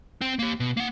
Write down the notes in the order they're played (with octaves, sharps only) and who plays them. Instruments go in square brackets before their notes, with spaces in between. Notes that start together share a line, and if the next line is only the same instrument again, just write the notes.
[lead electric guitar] C4 G5
A#3 G4
B2
A#3 F#5